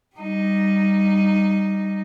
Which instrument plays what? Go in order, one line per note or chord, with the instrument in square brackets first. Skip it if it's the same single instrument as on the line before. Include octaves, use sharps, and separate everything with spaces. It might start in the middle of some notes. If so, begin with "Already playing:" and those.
[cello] G3 D#4